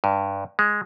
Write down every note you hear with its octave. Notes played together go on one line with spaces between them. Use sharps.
G2
G#3